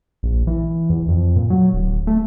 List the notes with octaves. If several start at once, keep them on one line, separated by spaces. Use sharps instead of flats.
A#1
E3
E2
F2
A#2
F#3
D1
A3